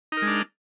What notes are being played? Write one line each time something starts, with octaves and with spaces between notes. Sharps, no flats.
G#3 D4 D#4 A#4